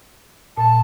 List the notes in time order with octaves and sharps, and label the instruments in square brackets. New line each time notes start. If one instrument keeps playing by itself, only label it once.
[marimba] A#2 [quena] A5